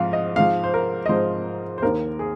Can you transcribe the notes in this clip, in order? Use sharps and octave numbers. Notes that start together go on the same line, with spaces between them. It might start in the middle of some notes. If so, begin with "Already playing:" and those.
Already playing: G#2 F3 F5
D#5
G#2 F3 F5
C5
A#4
D#5
G#2 F3 C5
C5
D#2 D#3 A#4
G#4